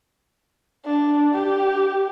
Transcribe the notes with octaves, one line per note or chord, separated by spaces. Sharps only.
D4
G4